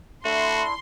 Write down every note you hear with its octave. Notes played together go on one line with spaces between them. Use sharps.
A3 D4 E4 F#4 C6